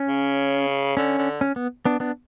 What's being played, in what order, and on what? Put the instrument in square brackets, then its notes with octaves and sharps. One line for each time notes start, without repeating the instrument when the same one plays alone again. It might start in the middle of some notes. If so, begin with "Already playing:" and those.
Already playing: [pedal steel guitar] C#4
[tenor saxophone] C#3
[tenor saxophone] D3 [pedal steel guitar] C#4
[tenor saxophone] D3
[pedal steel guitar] C#4
B3
B3 D4
B3 D4